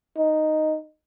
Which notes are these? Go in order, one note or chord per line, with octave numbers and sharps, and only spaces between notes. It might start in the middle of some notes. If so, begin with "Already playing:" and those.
D#4